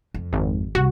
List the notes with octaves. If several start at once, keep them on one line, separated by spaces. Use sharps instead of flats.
F2
G#1
C2 F#4